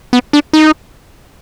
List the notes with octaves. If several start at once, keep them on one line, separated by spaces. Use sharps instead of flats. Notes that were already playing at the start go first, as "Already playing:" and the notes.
B3
D4
D#4